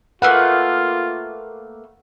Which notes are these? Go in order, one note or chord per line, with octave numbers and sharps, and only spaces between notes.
A3 A#3 F4 B4 F#5